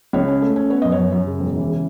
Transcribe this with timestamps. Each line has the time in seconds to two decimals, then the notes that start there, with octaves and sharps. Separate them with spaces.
0.13 C#2 C#5
0.28 C#4
0.42 A3
0.56 C#4
0.70 B3 C#5
0.82 F#2 D#5
0.92 C#5
0.98 F#2
1.12 F#2
1.27 C#3
1.40 E1
1.55 E3
1.70 C#3